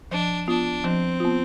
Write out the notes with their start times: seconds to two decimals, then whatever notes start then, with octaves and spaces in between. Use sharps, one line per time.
0.11 F3 D4
0.48 B3 D4 F4
0.84 F3 C4
1.20 B3 F4